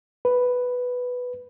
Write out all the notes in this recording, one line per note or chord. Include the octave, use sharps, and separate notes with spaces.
B4